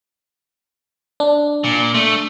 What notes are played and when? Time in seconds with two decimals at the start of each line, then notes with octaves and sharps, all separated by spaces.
1.20 D4
1.64 A#2
1.94 A3